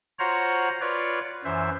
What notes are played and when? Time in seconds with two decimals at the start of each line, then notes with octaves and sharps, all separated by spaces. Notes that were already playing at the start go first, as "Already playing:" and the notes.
0.19 F4 F#4 C5 C#5 F#5 A#5
0.81 F4 B4 C#5 D5
1.45 F#2 E3 C5 E5